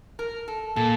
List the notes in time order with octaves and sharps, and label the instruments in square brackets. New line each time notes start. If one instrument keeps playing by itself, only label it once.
[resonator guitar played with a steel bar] A#4
A4
[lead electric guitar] A#2 [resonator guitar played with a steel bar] A4